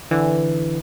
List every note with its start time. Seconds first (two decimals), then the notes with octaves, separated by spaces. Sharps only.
0.11 D3 E3